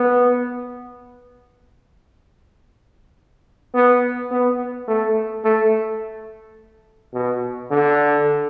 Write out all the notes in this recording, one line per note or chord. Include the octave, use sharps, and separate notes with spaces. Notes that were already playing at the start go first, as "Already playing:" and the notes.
Already playing: B3
B3
B3
A3
A3
B2
D3